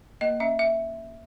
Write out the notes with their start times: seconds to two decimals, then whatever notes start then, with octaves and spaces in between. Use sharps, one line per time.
0.21 A#3 D#5
0.40 C#4 E5
0.59 E5